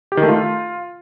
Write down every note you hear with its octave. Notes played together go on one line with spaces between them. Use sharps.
G4
D#3
A3
F4